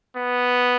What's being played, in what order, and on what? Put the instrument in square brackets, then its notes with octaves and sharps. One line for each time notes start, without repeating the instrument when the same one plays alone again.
[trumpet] B3